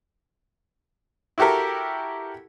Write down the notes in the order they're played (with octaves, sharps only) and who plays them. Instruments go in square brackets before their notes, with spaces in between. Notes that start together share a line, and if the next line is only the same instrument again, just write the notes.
[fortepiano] E4 F#4 G4 A4 A#4